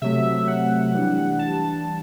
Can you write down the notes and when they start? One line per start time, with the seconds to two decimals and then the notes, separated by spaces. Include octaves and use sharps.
0.02 C3 F#3 A3 E5
0.47 F#5
0.94 E3 G3 D4
1.39 A5